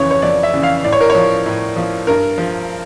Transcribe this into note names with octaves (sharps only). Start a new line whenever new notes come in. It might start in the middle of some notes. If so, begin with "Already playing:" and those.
Already playing: F2 C#3 E3 C#5
C#5
F2 D5
E5
C#3 E3
F5
A2 D5
C#5
A#4
C#5
F3
A2
F3
G2 A#4
F3